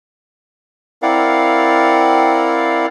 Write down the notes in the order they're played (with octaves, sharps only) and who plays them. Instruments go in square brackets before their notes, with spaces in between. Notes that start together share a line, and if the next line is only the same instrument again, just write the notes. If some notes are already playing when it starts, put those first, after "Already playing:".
[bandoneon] C4 E4 A#4 D5 F5 F#5